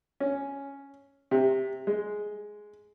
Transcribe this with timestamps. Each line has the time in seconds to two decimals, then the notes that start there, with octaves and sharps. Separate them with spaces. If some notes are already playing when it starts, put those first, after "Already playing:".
0.20 C#4
1.31 C3
1.87 G#3